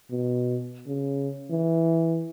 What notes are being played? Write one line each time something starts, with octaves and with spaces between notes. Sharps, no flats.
B2
C#3
E3